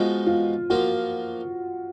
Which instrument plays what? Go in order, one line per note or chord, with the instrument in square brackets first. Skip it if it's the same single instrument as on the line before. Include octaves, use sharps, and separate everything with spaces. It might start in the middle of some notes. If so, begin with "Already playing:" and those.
Already playing: [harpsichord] F3 G#3 B3 D#4 F#4 [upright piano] F4
[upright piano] F4
[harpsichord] F3 A#3 F4 [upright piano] F#4